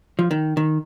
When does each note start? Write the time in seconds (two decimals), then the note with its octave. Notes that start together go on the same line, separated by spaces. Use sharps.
0.19 F3
0.31 D#3
0.57 D#3